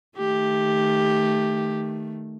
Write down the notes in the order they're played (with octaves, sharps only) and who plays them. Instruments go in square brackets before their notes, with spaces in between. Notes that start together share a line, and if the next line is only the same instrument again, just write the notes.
[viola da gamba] D#3 A3 [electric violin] G4